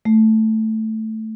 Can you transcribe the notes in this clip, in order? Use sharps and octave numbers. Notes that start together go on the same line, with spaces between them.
A3